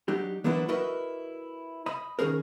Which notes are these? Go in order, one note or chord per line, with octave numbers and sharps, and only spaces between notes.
F#3 D4 D#4 G4
E3 F#3 A#3 B3 D4 E4
E4 F#4 A#4 B4 D#5 E5
D#5 B5
D#3 F#3 C#4 G#4 A#4